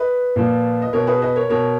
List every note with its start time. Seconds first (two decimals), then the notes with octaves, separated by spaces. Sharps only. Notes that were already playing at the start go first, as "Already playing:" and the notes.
Already playing: B4 D#5
0.36 A#2 F3
0.82 D#5
0.93 B2 A#4 C#5
1.07 G#4 B4
1.22 B4 D#5
1.36 A#4 C#5
1.50 B2 A#4 C#5